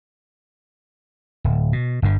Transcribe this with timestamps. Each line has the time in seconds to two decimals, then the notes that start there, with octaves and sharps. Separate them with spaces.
1.44 D1
1.73 B2
2.02 G1 G2 D3